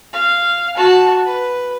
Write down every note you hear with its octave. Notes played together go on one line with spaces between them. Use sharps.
F5
F#4 A5
B4